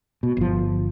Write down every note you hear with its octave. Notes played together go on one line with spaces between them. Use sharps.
B2
G1 F3